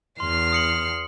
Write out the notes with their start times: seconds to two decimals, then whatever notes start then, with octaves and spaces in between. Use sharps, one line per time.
0.20 E2 C6 F6 C7
0.52 D#6 C#7 F#7